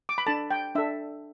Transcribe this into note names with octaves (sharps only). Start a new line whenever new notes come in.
D6
B5
D4 A4 A5
G5
D4 A4 E5